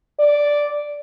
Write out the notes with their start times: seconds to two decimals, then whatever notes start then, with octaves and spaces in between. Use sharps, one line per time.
0.19 D5